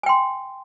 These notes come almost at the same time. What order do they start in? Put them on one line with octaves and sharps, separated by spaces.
G#5 G5 C6